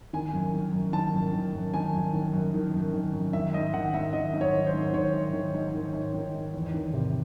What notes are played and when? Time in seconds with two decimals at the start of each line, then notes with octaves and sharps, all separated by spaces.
0.13 D#3 G#5
0.34 F#2
0.54 D#3
0.73 F#2
0.93 D#3 A5
1.13 F#2
1.33 D#3
1.53 F#2
1.74 D#3 G#5
1.93 F#2
2.13 D#3
2.33 F#2
2.54 D#3
2.74 F#2
2.93 D#3
3.13 F#2
3.33 D#3 E5
3.53 G#2 D#5
3.74 D#3 F#5
3.94 G#2 E5
4.13 D#3 D#5
4.34 G#2
4.41 C#5
4.53 D#3
4.67 C5
4.74 G#2
4.93 D#3 C#5
5.14 G#2
5.33 D#3
5.54 G#2
5.73 D#3
5.93 G#2
6.14 D#3
6.34 G#2
6.54 E2
6.74 D#3
6.94 C3